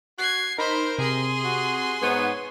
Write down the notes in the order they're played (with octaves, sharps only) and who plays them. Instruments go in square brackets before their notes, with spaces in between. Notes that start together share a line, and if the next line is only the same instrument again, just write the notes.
[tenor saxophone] F#4 [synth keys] F#6 [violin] G#6 C7
[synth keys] D#4 B5 B6 [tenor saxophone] A#4 [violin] C5
[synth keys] C3 [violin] G#4 C6
[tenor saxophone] F#4
[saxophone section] G#2 B3 [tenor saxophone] C#5